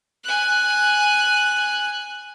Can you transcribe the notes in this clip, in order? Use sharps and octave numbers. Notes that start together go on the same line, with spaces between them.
G#5 F#6